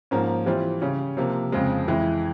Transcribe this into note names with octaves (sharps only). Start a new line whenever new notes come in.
G#2 F3 A#3 C#4
E3 G3 C4 F4
C#3 G3 C#4
C3 F3 A#3
F2 C#3 F3 G#3
F2 E3 G#3 E4